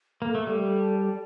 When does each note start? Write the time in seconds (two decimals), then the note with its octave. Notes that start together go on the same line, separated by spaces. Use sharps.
0.22 A#3 A4
0.35 A3
0.41 A4
0.47 G3
0.60 A4
0.79 A5
0.96 D5